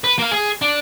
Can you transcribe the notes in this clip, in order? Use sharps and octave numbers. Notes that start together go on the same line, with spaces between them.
B4
A#3 F5
G#4
D4